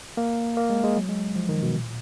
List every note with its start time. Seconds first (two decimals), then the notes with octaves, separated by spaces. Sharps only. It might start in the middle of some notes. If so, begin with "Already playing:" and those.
0.17 A#3
0.57 A#3
0.70 G#3
0.84 G#3
0.97 F#3
1.09 G#3
1.36 F3
1.49 D#3
1.63 B2
1.75 A#2